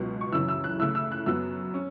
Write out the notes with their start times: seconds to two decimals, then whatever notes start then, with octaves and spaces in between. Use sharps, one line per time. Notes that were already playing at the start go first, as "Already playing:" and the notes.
Already playing: C#2 B2 F#3
0.21 C#6
0.32 F#2 C#3 E3 C#4 E4 E6
0.48 E6
0.64 F#6
0.79 C#3 A3 E4 E6
0.95 E6
1.12 F#6
1.26 F#2 F#3 B3 E6
1.74 C#4